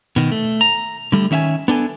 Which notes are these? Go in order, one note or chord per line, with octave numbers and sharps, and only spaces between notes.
B2 D#3
A3
A#5
D3 G3 A3
D#3 C#4 E5 F5 G#5
B3 D4 A4 G#5